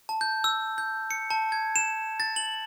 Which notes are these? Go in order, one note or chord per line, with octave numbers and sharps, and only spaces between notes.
A5
G6
E6
G6
C#7
A5
G#6
E7
A6
F#7